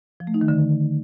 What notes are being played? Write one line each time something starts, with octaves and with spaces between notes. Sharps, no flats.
F3
A3
D#4
D#3
D3